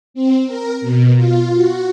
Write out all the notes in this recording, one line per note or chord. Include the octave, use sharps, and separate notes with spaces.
C4
A#4
B2
F4
F#4